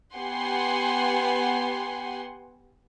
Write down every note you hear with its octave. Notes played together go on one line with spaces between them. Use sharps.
B3 G4 F#5 G#5 C6